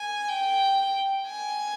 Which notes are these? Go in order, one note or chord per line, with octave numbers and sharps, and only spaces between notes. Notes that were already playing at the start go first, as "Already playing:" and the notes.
Already playing: G#5
G5
G#5